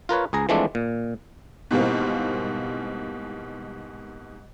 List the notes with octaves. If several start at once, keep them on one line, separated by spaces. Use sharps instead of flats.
F4 A#4 B4 C#5
C#2 G#4 A#5
E3 F3 G#3 A3 C4 D4
A#2
G#2 B2 E3 G3 A#3 C4